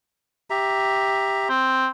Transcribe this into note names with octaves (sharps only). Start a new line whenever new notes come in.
G4 E5 A#5
C4